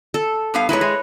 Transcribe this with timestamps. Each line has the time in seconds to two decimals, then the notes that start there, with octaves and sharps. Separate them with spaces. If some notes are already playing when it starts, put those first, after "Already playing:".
0.14 A4
0.54 G2 B3 F5
0.69 G#2 G#3 E4 B4 C#5
0.81 G#3